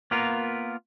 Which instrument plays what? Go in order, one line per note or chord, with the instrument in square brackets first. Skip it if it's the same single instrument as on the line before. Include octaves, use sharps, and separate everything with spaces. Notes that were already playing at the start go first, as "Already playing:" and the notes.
[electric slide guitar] A#3 B3 F4 A#4